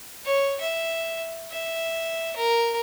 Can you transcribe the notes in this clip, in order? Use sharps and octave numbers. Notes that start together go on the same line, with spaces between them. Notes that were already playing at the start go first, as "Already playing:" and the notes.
C#5
E5
E5
A#4